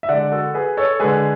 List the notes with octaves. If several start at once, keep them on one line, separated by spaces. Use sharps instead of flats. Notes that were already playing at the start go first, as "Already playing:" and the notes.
E5
D3 G#3 D5 F#5
F#4 A4
G#4 B4
A4 C#5
D3 G#3 G#4 B4